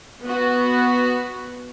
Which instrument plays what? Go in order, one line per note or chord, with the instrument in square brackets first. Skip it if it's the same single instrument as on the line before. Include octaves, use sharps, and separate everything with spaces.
[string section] B3 F#4